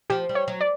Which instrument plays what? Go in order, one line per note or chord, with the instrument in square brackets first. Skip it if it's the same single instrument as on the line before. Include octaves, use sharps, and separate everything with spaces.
[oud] F3 [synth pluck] G4
[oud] G3
[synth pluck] C#5
[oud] F#3
[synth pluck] D5